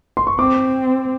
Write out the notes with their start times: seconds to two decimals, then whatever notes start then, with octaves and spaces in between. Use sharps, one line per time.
0.17 C6
0.27 C#6
0.39 C4 D6